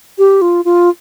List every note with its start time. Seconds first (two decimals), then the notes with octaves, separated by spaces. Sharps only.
0.18 G4
0.41 F4
0.65 F4